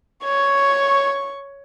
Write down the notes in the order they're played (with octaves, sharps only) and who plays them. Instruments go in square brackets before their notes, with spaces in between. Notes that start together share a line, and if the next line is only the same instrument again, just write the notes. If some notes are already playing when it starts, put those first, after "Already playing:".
[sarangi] C#5 [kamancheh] C#6